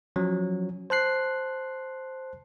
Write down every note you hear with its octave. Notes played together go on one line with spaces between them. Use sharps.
F3 F#3 C#4
C5 A5 F#6 C7